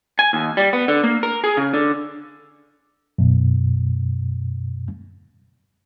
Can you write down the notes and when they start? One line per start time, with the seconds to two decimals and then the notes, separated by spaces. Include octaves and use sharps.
0.19 G#5
0.33 D#2
0.57 G3
0.73 B3
0.88 D3
1.04 A#3
1.23 A#4
1.44 G#4
1.57 C#3
1.74 D3
3.19 F#2 B2